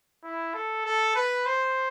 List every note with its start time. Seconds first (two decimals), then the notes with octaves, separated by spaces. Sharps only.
0.23 E4
0.54 A4
0.85 A4
1.15 B4
1.46 C5